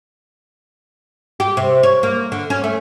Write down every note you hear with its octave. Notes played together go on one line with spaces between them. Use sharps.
G4
C3
C#5
A#3
D3
C#4
A3